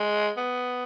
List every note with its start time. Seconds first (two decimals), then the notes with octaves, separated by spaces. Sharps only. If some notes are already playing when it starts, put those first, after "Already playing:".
Already playing: G#3
0.37 B3